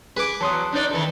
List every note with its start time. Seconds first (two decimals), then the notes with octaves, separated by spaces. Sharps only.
0.17 G#4 B4 D6
0.41 E2 F#3 A5 C6 D#6
0.72 D4 D#4 D5
0.91 D#3 E3 A4